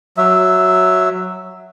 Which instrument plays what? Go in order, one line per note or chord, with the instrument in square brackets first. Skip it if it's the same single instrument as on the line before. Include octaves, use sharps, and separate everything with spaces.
[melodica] F#3 E5